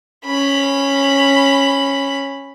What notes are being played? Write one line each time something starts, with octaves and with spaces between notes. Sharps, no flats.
C#4 B5